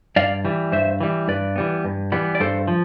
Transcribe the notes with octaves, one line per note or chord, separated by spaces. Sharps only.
G2 D5 F5
E3 G3
G2 C5 E5
E3 G3
G2 B4 D5
E3 G3 B3
G2
E3 G3 B3
D5
G2 A4 C5
F3